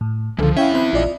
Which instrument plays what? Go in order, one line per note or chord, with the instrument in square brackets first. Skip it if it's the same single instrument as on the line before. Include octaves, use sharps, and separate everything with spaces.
[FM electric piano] A2
[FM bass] C#2 [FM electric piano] D3 [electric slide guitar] E3 F3 [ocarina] A4
[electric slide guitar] E2 E5 [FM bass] C#4 [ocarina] E4 [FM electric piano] F5 G5 G#5
[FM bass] C4 [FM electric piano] B5 F#6
[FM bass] A#1 [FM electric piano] F4 D5 D#5